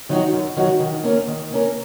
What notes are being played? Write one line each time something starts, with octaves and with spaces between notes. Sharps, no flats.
D#3 F#3 D#4 F#4
F#2
D#3 F#3 D#4 F#4
D#3
A#3 C#4 A#4
D#3
A#3 C#4 A#4